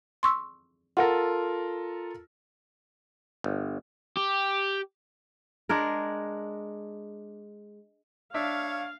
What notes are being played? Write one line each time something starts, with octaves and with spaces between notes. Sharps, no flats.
C6 C#6 E6
F4 A4 A#4 F#5
G1
G4
G#3 D4 G#4 A#4
D4 C#5 E5 F5